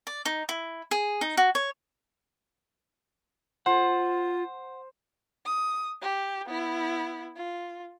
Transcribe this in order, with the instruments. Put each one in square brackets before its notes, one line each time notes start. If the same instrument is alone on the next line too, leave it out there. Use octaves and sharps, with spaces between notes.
[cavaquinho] D5
D#4
E4
G#4
D#4
F#4
C#5
[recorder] F4 [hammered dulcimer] C5 [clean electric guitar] F#5
[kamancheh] D#6
G4
B3 E4
F4